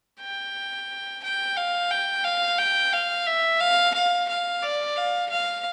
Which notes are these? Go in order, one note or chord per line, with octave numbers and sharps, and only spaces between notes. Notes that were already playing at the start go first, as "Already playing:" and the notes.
G5
G5
F5
G5
F5
G5
F5
E5
F5
F5
F5
D5
F5
F5